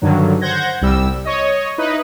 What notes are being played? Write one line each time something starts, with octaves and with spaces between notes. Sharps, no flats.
G2 D3 D#3 F#3
C5 F#5 G6 G#6 A#6
C2 G3 E6
C#5 D#5
D#4 E4 B4 D#5